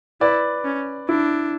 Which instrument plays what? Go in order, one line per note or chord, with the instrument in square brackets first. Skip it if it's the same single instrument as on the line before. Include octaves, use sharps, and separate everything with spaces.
[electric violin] E4 [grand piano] B4 D5
[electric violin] C#4
[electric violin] D4 [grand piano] E4